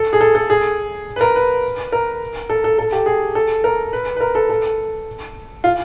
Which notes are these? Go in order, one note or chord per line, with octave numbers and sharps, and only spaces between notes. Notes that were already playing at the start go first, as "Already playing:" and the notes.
Already playing: A4
G#4
A4
A4
G#4
B4
A#4
B4
A#4
A4
A4
A4
G4
G#4
A4
A#4
B4
B4
A#4
A4
A4
F4